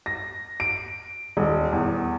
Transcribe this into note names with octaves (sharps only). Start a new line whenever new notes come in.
A#6
D7
D#1
E2